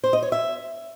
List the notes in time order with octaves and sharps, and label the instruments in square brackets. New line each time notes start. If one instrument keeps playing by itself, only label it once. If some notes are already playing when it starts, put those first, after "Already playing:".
[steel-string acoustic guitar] C5
D#5
C#5
E5